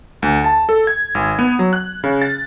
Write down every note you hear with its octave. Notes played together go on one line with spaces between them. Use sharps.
D2
A5
A4
G#6
G#1
B3
F#3
F#6
C#3
A6